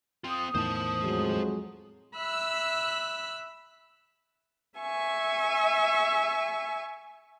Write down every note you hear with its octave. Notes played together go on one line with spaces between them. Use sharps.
C4 F4 D#6
E2 A2 D#3 C5 A5
F2 F#3 G#3
E5 B5 E6 F#6
E5 G#5 C#6